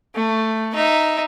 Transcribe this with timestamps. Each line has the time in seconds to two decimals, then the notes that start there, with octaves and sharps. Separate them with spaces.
0.15 A3
0.75 D#4 E5